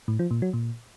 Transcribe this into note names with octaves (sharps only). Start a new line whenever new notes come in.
A2
F3
A#2
F#3
A#2